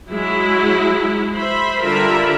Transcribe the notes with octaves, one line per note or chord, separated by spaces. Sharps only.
F#3 G#3 E4
C5 E5 B5
D3 G3 F4 A#4 E5 B5